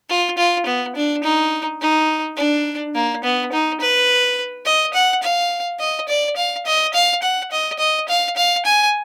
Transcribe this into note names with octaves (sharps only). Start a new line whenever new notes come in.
F4
F4
B3
D4
D#4
D#4
D4
A#3
B3
D#4
B4
D#5
F#5
F5
D#5
D5
F5
D#5
F5
F#5
D#5
D#5
F5
F5
G#5